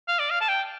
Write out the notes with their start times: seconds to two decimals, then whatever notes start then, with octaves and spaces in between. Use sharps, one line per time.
0.08 F5
0.19 D5
0.31 F5
0.41 A5
0.49 G5